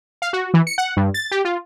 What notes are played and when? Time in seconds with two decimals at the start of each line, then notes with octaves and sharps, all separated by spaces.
0.22 F5
0.33 F#4
0.54 E3
0.67 C#7
0.78 F#5
0.97 G2
1.14 A6
1.31 G4
1.45 F4